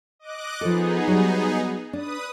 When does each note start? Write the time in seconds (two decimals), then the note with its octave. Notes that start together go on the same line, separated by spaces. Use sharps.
0.19 D#5 D6 F#6
0.61 F3 B3 D#4 G#4 A4
1.07 F#3 G3
1.93 D4 B4 D#6